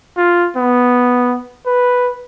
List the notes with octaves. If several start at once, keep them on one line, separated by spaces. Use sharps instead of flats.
F4
B3
B4